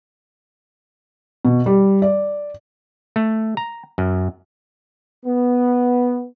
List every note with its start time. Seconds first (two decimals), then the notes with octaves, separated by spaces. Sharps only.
1.45 B2
1.66 G3
2.02 D5
3.16 A3
3.57 A#5
3.98 F#2
5.26 B3